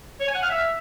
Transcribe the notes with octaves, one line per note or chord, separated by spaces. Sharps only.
C#5
G#5
F#5
F5
E5